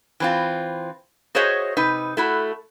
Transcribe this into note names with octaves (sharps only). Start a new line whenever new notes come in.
E3 C4 F4
F#4 G#4 C5 C#5 D#5 E5
C3 D#4 B4
A3 E4 F#4